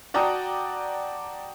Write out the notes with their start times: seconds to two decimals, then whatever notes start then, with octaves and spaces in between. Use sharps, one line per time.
0.14 F#4 D5 G5 A5 A#5 D#6